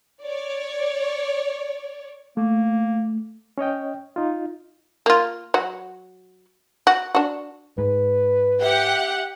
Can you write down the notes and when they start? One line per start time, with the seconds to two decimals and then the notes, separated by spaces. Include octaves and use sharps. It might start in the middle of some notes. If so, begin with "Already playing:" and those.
0.24 C#5 D5
2.37 A3 A#3
3.58 C#4 C#5 D#5 G5
4.16 D#4 F4
5.06 A#3 F4
5.54 F#3 F#4
6.87 F#4
7.15 D4 F#4
7.78 G#2 B4
8.62 G4 E5 F#5